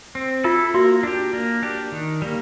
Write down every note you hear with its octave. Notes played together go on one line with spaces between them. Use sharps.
C4
E4 F4 A4
A#3 F#4
D4 G4
A#3
D4 G4
D#3
G3 A#3